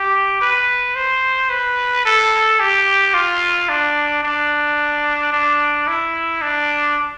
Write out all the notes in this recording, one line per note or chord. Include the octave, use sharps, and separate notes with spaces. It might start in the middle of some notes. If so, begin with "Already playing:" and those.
Already playing: G4
B4
C5
B4
A4
G4
F4
D4
D4
D4
E4
D4